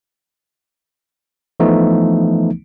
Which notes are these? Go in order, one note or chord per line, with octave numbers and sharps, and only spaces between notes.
E3 F3 A3 B3 D#4